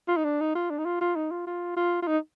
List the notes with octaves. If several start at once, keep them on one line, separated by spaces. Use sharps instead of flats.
F4
D#4
D4
D#4
F4
D4
D#4
F4
F4
D#4
F4
F4
F4
F4
D#4